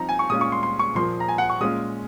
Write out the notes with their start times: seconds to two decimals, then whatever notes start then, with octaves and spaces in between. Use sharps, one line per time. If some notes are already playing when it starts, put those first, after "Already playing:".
Already playing: F3 C4 D#4 A#5
0.09 G#5
0.19 C#6
0.30 A#2 G#3 C#4 F4 D#6
0.41 C#6
0.52 C6
0.63 C6
0.79 C#6
0.95 A#2 F3 A#3 C6
1.20 A#5
1.28 G#5
1.38 F#5
1.50 C#6
1.60 A#2 G#3 C#4 F4 D#6